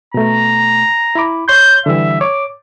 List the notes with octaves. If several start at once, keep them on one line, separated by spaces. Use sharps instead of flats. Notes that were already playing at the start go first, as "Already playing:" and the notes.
B2 A3 A#5
E4 B5 D6
C#5 C6 G6
D3 E3 G3 E5
C#5 D6